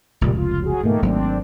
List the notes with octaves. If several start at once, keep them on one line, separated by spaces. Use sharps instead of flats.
F1 C#2 A#2 G3
F4
F#3 G#4
G#2 B2 D#3 A3 A#3
G#1 F#3 A#3 C4 D4